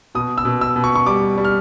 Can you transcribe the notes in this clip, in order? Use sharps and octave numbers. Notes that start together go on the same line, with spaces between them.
B2 D#6
E6
B2
E6
B2
C#6
C#6
G3 D6
G3
F6